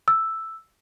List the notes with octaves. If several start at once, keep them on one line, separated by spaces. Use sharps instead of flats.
E6